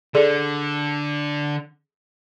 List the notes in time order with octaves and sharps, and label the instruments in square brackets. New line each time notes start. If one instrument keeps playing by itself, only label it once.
[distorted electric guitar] D3 [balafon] G#4 A4 D5